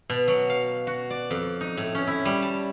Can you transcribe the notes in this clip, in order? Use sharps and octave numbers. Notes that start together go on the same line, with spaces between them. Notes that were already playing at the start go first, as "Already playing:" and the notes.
B2
F#3
F5
F#4
D5
F2
D#4
A2
C#4
E4
G3
A5